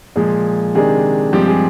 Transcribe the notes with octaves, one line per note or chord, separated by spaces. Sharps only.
A#2 F3 G#3 G#4
C3 D#3 G#3 D4 G#4
G2 F3 G#3 C4 G4
G#4